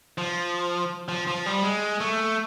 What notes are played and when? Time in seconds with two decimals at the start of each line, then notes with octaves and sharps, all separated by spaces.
0.18 F3
1.08 F3
1.27 F3
1.46 G3
1.63 G#3
2.00 A3